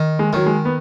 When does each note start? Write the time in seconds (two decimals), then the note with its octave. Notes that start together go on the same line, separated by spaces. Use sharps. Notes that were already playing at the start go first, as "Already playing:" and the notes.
Already playing: D#3
0.19 G#3
0.33 D#3 F#3
0.46 G#3
0.65 B3